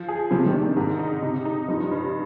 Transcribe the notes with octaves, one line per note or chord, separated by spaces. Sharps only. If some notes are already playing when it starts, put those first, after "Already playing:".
Already playing: F3
G#4
C3 F3
D#3
D4
D#3
G#2
D#4
C3
D#4
G2 F3
G2